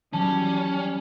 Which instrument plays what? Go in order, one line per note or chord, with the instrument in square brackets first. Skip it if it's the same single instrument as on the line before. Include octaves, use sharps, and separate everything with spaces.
[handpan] D#3 E3 F#3 [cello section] G3 [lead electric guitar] C#4 [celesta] A5